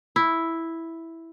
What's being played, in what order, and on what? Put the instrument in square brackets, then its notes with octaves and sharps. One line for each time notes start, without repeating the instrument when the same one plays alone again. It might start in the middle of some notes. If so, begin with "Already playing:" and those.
[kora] E4